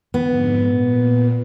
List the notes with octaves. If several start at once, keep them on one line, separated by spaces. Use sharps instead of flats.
F2 G#2 D3 B3
A#2